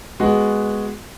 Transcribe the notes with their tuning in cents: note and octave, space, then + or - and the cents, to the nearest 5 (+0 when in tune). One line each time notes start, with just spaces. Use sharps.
G#3 +0 B3 +0 F#4 +0